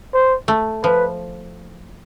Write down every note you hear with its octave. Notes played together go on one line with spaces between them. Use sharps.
C5
A3
F3 B4